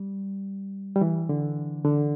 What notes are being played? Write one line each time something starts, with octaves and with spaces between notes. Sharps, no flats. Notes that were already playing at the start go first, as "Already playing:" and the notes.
Already playing: G3
G3
E3
D3
D3